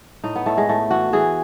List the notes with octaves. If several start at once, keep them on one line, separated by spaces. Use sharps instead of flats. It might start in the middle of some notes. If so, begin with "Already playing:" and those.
A2 D#4
B3
A2 A3
G#3
A2 A3
E3 F#4
E3 G#4